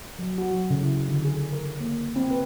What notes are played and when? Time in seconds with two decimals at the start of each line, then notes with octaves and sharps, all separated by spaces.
0.19 F#3
0.38 F#4
0.51 F#3
0.70 C#3
0.82 E4
1.09 D3
1.25 G#4
1.53 A#4
1.80 A#3
2.16 C4
2.31 B4